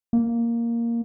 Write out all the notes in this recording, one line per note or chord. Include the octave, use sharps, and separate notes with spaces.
A#3